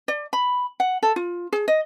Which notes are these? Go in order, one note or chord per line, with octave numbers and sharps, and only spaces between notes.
D5
B5
F#5
A4
F4
G#4
D#5